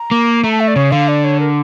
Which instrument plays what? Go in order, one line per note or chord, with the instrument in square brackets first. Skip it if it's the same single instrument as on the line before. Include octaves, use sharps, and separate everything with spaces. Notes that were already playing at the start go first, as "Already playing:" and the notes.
Already playing: [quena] A#5
[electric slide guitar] A#3
[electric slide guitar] A3 [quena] A#5
[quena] A5
E5
D5
[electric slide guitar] C#3 [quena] C#5
[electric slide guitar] D3 [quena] F5
[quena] D5
C#5
A#4